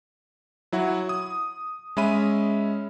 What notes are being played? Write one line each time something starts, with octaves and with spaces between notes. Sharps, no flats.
F#3 E4 F#4
D#6
G#3 C#4 E5 B5 D#7